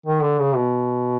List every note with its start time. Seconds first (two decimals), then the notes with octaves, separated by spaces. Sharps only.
0.06 D#3
0.23 D3
0.39 C#3
0.56 B2